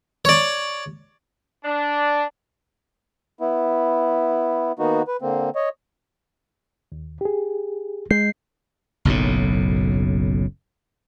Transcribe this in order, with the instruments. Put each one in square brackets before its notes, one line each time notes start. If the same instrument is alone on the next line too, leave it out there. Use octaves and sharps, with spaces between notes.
[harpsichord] C#5 D5
[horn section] D4
[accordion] B3 E4
D#3 A#3 B3 D#4 F#4
B4
D3 A#3 C4
C#5 D#5
[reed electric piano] D#2
G4 G#4
[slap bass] G#3 [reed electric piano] G6 [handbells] C7
[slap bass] F#1 B1 F#2 A2